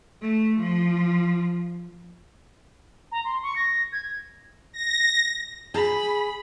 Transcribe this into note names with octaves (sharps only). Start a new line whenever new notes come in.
A3
F3
A#5
C6
C#6
A#6
G#6
A#6
G#4 B5